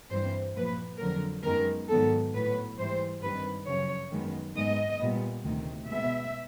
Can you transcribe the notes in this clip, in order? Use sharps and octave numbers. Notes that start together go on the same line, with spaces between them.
G2 E3 G3 C4 C5
A#2 F3 A#3 B4
F2 D3 F#3 A#4
F#2 D#3 G#3 B3 A#4
G#2 D#3 F#3 B3 A4
A2 F#3 B3 B4
G#2 E3 G3 C5
G2 D#3 G3 C4 B4
F#2 C#3 F3 C#5
F#2 D#3 G#3 B3
G#2 D#3 G#3 B3 D#5
A#2 G3 B3
D2 C3 D#3
B2 G#3 B3 E5